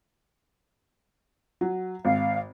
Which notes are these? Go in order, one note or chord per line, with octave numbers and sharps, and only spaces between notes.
F#3
G#1 F5